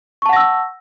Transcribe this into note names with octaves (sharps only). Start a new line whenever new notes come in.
F#5 A5 C#6 E6 A#6